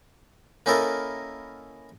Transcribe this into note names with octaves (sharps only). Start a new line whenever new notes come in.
A#3 C#4 D#4 E4 A4 A#4